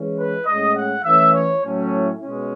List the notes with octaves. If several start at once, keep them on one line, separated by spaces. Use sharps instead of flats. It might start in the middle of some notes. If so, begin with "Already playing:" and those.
Already playing: E3 G#3 C#4
B4
A2 G#3 C#4 D#5
F#5
E3 A3 C#4 E5
C#5
A2 F#3 A3 C#4
E4
B2 G#3 C#4